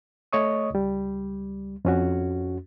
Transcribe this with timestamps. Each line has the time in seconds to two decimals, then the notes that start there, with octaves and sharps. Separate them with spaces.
0.33 A3 C#5 D#5 C#6 D#6
0.70 C#2 G3
1.85 F2 C#4 F#4